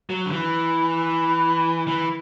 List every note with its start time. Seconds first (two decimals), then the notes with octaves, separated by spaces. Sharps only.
0.10 F#3
0.25 D3
0.31 E3
1.88 E3